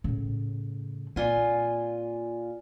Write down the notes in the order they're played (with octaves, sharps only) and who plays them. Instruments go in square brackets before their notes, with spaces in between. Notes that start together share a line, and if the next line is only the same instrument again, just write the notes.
[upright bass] A2 C#3
[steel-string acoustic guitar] A#2 F4 G#5 [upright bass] C4